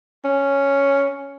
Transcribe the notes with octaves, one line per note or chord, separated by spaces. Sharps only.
C#4